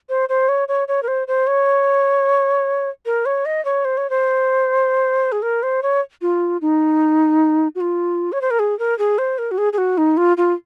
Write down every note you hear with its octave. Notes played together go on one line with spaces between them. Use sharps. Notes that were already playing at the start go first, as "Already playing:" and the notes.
C5
C5
C#5
C#5
C#5
A#4
C5
C5
C#5
A#4
C#5
D#5
C#5
C5
C#5
C5
G#4
A#4
C5
C#5
F4
D#4
F#4
F4
C#5
C5
A#4
G#4
A#4
G#4
C5
A#4
F#4
G#4
G#4
F#4
D#4
F4
F4